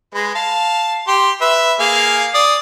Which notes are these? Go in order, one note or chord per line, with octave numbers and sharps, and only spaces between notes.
G#3 B4
F5 A5
G4 C6
B4 E5
A#3 G#4 F5
D5 D#6